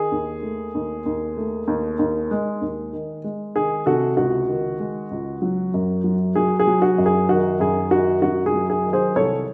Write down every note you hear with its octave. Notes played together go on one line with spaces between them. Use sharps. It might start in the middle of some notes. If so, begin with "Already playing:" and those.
Already playing: D#3 G#4
D#2
A3
D#2
D#2
A3
D#2
D#2
G#3
D#2
D#3
G#3
D#3 G#4
C3 F#4 A4
C#2 F#4
D#3
G#3
C#2
F#3
F#2
F#3
F#3 G#4
G#4
F#3
F#4
F#2
G#4
D#3 F#4
F#2 G#4
D#3 F#4
F#2 F#4
G#4
F#3
G#4
D#3
G#4 C5
C2 A4 C#5